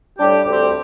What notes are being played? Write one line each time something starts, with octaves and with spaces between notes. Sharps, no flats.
A2 G3 D4 G4
D2 D3 G3 C4 G4